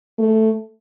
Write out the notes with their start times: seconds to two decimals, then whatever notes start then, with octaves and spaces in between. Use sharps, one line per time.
0.19 A3